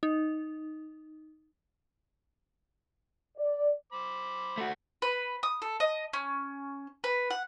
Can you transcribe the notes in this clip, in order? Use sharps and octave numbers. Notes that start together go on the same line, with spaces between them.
D#4
D5
C5 B5 D6
A3 F#4
B4
D#6
A4
D#5
C#4
B4
F#5